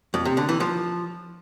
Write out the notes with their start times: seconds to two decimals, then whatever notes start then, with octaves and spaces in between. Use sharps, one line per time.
0.14 F2
0.25 C3
0.37 D3
0.49 E3
0.60 F3